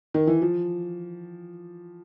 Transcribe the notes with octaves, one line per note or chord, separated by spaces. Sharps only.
D#3
E3
F3